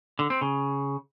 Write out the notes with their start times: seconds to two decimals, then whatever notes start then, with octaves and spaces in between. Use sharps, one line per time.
0.19 D3
0.30 C4
0.41 C#3